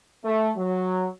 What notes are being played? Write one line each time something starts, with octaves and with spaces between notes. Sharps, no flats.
A3
F#3